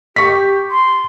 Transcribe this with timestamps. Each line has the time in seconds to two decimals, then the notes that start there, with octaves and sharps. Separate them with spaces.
0.16 G4 C#6 B6
0.70 C6